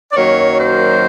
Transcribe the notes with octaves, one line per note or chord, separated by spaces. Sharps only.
D5
F#2 D#3 F#3 A#3 C#5
C5